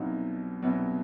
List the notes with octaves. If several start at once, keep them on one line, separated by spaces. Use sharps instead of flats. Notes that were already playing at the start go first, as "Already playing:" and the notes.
Already playing: C2 B2 F#3 D#4 F4
C2 B2 F#3